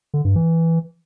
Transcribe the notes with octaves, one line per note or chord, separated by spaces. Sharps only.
D3
G2
E3